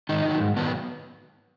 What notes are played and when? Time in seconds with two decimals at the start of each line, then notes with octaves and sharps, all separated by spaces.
0.09 G#2 D#3 D#4
0.25 D#3 F#3
0.40 G#2
0.56 D#3 F#3 B3 B4